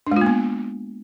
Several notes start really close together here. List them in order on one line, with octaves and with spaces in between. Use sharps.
D4 G#3 F4 A#3 B3